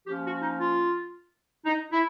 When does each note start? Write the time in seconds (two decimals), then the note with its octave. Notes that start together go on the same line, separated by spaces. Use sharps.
0.07 F3 A#3 C#4 G4
0.25 F#4
0.42 D#4
0.60 F4
1.65 D#4
1.92 E4